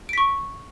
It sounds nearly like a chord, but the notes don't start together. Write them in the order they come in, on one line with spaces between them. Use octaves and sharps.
D7 B6 C#6